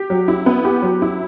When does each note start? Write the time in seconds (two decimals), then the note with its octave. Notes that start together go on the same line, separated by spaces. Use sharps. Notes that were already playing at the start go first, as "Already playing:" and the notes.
Already playing: G4
0.10 F#3
0.28 E4
0.46 B3
0.65 G4
0.82 F#3
1.02 E4